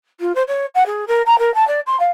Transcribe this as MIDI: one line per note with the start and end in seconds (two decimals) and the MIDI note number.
0.20 0.35 65
0.35 0.43 72
0.48 0.66 73
0.75 0.84 78
0.86 1.05 68
1.08 1.22 70
1.26 1.38 82
1.39 1.54 70
1.54 1.67 81
1.67 1.80 74
1.86 1.97 84
2.00 2.11 77